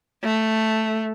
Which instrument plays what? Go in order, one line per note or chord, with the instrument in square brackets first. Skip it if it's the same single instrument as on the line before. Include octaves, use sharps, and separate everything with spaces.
[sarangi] A3